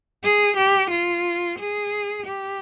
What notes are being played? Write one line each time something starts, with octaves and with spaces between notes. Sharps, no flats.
G#4
G4
F4
G#4
G4